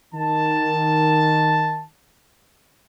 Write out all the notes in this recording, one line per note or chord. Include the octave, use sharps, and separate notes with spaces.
D#3 A5